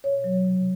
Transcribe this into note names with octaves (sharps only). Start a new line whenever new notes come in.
B2 C#5
F#3
C3